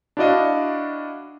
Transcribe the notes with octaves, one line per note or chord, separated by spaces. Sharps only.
D4 E4 F#4 D5 D#5 F5